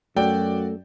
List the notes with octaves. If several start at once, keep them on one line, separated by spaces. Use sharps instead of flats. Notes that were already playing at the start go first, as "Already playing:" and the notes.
F#2 A3 F#4 D5 G5